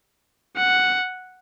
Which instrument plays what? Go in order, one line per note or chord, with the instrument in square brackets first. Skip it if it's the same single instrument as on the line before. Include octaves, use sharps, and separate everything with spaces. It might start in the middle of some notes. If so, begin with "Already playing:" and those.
[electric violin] F#5